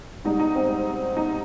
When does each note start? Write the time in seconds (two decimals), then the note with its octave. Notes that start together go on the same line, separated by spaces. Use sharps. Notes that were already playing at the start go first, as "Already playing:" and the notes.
0.24 G#2 G3 D#4
0.40 D#4
0.55 C4
1.17 D#4